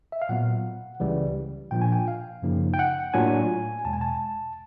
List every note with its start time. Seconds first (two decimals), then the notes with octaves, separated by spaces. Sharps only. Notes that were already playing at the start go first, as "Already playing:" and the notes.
0.12 E5
0.22 F5
0.29 A#2 F#3 B3 F#5
1.00 C#2 C#3 E3 G3
1.71 A#2 F3 A#3 D4 F4 G5
1.81 G#5
1.92 G5
2.08 F5
2.42 F#2 C#3 F3 A#3 D#4
2.74 G5
2.79 F#5
3.14 A2 F#3 A#3 D4 F4 G#5
3.85 E2 B2 G#3 A5
3.93 G#5
4.01 A5